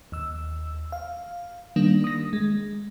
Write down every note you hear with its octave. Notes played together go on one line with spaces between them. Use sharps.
D#2 E6
F5
D#3 G3 A#3 D4
D#6 A#6
G#3